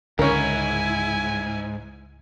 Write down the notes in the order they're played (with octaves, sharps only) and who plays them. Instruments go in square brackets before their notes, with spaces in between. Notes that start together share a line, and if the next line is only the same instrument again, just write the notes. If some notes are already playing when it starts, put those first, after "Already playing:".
[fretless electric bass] C#2 D3 [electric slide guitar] G#2 [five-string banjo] C#4 A#4 [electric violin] E4 G#5